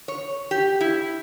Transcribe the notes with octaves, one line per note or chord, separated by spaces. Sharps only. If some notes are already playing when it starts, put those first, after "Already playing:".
C#5
G4
E4